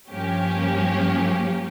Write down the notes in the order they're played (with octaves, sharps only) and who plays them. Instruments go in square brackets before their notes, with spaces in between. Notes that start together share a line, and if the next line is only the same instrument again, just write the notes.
[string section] G2 F3 A#3 C#4 G4